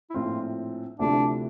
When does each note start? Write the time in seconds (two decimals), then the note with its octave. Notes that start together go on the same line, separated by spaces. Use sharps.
0.10 E4
0.14 A#1 A2 F3 C4 F4
0.99 D2 C3 F3 A3 D4 E4